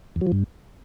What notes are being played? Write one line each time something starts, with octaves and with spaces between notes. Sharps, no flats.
E2
F#3
F3
G2